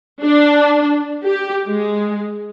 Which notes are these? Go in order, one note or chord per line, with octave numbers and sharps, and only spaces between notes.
D4
G4
G#3